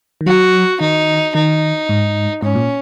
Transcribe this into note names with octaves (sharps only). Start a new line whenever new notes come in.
D#3
F#3 F#4
D#3 D#4
D#3 D#4
G#2
G#2 C#4
A#2